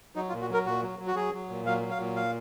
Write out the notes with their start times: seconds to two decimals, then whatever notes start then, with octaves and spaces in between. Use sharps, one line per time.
0.15 F#3 D#4
0.29 F4
0.33 A#2
0.41 F#4
0.49 F#3 A#4
0.66 A#2 F#4
0.82 F#3
0.99 F#3
1.07 F#4
1.16 F#3 G#4
1.33 F#3
1.50 A#2
1.66 F#3 F5
1.82 F#3
1.91 F5
1.99 A#2
2.16 F5